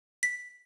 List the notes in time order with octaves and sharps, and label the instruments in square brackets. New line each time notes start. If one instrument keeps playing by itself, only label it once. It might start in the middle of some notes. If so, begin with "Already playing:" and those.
[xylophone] B6